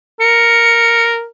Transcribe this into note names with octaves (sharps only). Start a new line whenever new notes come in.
A#4 C#7